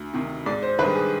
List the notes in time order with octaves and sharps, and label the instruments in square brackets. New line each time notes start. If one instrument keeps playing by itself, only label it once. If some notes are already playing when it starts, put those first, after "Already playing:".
Already playing: [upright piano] D2
C3 D#3
[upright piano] G#2 [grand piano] D5
[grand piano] C5
[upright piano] D#3 G3 D4 G#4 [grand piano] B4
[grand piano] G#4